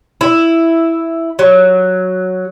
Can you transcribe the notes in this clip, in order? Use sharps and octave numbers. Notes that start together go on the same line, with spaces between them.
E4
F#3